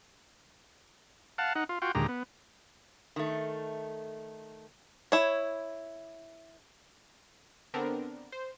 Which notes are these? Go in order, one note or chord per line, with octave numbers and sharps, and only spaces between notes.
F5 F#5 A5
D#4 F#5
F4
F4 F#4 G5
D#2 A#2 D3 G#3 G4 A#5
B3
D#3 A3
E4 C#5
D3 B3 C4 D4 A#4
C5